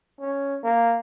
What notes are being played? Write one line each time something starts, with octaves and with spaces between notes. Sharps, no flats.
C#4
A#3